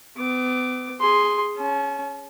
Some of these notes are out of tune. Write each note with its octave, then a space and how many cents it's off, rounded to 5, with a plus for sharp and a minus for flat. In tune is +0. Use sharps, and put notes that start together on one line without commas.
B3 +40 D6 +0
G#4 +0 C6 +0
C#4 +0 A5 -45